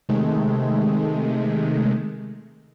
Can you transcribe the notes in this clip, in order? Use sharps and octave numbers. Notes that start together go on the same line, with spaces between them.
C3 D#3 G#3 A3